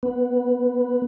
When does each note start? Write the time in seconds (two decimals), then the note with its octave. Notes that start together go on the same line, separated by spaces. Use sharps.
0.03 B3